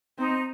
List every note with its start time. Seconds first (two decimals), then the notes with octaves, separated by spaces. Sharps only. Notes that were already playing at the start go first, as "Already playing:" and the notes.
0.18 C4 D#4